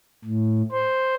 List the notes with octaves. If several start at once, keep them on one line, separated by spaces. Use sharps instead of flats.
A2
C5